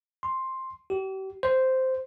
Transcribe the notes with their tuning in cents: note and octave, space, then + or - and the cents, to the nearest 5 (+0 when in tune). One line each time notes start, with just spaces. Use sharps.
C6 +5
G4 -40
C5 -5